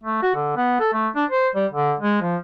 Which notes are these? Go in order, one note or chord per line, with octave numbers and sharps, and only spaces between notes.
A3
F#4
D3
B3
A4
A3
D4
C5
G3
D3
G#3
F3